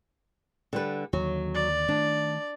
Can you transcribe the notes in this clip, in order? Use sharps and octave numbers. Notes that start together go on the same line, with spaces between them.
D3 G3 B4
D#2 D3 F#3
D5
D#3 A3 D4